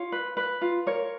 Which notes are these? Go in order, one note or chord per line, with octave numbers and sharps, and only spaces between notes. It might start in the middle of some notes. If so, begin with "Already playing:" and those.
Already playing: F4 C#5
B4
B4
F4
A#4 C#5